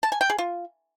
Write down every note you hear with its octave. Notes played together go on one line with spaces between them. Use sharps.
A5
G#5
G5
G#4
F4